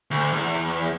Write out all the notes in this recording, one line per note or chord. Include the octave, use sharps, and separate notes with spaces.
D2
E2